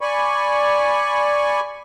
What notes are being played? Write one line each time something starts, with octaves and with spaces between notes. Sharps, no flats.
D5 G#5 B5 C#6